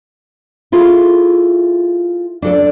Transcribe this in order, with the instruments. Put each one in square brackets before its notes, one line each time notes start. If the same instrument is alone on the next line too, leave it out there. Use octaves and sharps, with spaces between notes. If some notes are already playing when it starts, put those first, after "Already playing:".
[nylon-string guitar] E4 F4 G#4 A4
D4 A4 D5